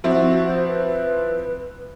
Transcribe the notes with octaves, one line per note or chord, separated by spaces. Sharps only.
F3 C4 E4 F#4
C5
B4
B4